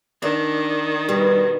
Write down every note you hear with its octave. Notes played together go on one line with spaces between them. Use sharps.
D#3 D4
B2 G3